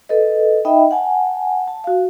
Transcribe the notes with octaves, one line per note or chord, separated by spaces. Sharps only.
A4 B4 D#5
D#4 D#5 E5 G5 B5
F#5 G#5 A5
A5
F#4 F5